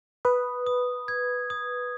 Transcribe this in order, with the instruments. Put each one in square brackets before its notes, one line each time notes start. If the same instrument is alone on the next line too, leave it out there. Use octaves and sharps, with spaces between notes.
[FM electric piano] B4 [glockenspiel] D#6
[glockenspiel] D#6
G#6
D#6